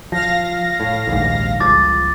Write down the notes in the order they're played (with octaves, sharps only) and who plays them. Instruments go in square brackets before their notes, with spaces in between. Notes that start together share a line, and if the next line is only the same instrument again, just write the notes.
[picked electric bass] F3 [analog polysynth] F5 A#6
[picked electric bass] A2
A#1 D#2 G#2
[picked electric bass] G1 C#2 F3 [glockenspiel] D6 A6